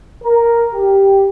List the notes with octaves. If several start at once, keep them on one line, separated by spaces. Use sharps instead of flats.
A#4
G4